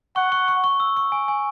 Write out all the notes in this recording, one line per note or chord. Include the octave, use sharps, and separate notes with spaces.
F#5 C#6
C#6
C#6
C#6
E6
C#6
G#5
G#5